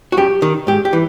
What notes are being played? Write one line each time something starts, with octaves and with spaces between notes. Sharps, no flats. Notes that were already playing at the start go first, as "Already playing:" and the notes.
F#4
F#2 G4
D#3
G#2 G4
G4
E3